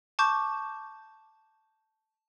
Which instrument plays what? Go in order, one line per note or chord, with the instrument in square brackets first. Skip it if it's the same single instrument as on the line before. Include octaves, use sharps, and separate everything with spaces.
[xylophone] A5 C#6 D6 G6